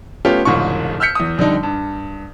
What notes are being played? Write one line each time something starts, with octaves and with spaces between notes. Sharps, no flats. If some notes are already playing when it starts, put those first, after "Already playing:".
A3 B3 C#4 F4 G4
E1 C2 G#2 C#3 F4 C#6
E6 F6 G6 B6 C#7
E2 D#6
F2 D3 G3 D#4
G2